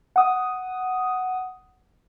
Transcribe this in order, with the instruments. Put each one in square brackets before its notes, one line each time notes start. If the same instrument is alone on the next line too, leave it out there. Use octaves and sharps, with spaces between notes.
[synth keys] F#5 D#6